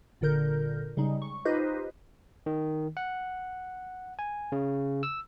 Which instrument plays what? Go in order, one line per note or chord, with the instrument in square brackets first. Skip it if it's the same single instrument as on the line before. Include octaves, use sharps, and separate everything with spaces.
[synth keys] G1 A#2 D3 A#4 G6
C#3 G3 G#3 D#4
C#6
D#4 F4 G4 B4 C5 D#5
[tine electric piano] D#3
F#5
G#5
C#3
E6